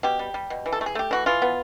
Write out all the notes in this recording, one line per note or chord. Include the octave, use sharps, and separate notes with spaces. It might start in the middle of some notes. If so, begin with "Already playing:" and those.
B2 G4
G3
G3
B2
E3
A4
A3
G#4
A3 G4
E3 F#4
E3 F4
B3